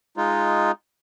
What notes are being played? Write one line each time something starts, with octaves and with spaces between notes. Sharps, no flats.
G#3 D#4 F4